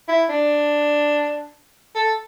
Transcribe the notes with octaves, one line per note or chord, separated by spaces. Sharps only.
E4
D4
A4